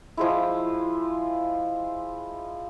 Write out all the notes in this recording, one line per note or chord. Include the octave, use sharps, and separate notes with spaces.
F3 G#3 E4